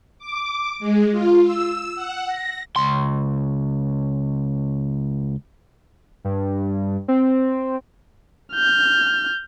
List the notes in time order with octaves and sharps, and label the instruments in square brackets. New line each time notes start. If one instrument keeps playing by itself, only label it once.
[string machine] D6
G#3
F4
E6
F#5
A#6
[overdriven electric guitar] C#2 C6
[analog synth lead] G2
C4
[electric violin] F6 G6